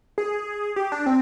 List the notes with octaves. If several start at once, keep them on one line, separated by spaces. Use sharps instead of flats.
G#4
G4
D4
C4